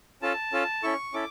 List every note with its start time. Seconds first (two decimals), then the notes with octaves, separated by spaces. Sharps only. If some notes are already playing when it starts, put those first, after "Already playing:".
0.22 C#4 F4 A4 A5
0.52 C#4 F4 A4
0.83 C#4 E4 A4 C#6
1.13 C#4 E4 A4 D6